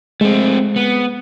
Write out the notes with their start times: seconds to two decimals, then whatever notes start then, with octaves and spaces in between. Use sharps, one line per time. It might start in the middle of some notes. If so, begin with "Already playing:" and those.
0.21 G#3 A3 C4
0.76 B3